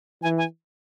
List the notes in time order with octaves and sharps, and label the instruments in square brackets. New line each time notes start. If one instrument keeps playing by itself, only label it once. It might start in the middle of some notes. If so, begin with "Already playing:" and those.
[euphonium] E3 [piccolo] G#5
[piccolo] G#5